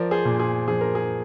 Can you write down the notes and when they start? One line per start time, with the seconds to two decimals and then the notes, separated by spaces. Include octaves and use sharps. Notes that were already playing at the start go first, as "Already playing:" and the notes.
Already playing: F3 A#4 D5
0.11 G#4 C5
0.25 A#2
0.40 G#4
0.67 F3 G#4
0.81 A#4
0.95 G#4